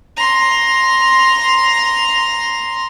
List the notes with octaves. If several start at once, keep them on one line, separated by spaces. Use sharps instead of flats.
A#5 C6